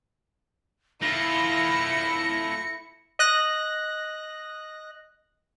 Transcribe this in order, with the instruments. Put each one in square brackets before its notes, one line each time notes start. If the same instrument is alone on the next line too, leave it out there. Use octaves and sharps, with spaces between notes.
[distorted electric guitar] A3 F4 [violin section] E4 C#7 [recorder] A#6
[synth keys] D#5 F#6 A#6